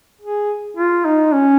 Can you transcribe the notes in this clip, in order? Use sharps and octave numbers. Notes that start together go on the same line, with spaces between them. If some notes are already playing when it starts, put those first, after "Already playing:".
G#4
F4
D#4
C#4